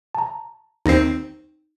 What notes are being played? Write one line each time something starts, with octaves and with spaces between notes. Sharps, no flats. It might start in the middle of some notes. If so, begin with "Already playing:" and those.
A5 A#5
D#2 C4 D#4 A#6 C7